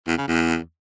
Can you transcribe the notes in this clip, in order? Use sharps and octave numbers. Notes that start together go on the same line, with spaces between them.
E2
C#3
E2